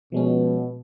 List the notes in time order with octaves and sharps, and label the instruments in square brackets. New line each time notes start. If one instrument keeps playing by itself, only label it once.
[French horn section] B2 [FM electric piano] F3 G#3 C#4